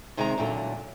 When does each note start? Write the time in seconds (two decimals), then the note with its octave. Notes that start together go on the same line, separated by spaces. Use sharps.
0.17 C3 D#3 G#3 C4 F5 A#5
0.38 E2 A#2 D3 E3 F#3